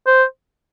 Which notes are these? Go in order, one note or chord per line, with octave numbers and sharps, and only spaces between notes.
C5